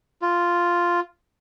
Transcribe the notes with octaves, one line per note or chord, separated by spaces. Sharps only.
F4